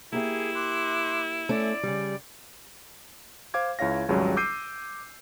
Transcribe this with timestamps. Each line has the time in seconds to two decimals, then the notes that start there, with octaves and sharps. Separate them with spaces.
0.13 A#3 E4 G4 G#4 E5
0.55 C6 D6 F#6
1.49 A3 C#4 D5
1.83 C#3 G3
3.54 C5 F5 D6 G#6
3.79 C#2 E4 C#5 F5 A#6
4.08 G#1 C#2 C#3 F#3 G3
4.37 D6 E6 G6 C7 D#7